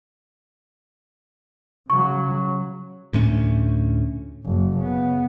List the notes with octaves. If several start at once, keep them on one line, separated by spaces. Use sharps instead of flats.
C#3 F#3 C#6
D2 A2 A3 C#4
F#1
C#3 B3